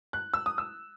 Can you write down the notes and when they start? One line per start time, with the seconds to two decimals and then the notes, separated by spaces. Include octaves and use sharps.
0.13 F#6
0.34 E6
0.46 D#6
0.58 E6